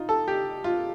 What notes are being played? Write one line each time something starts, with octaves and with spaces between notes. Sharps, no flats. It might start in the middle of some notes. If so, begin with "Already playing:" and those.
Already playing: D#4 F4
A4
G4
F4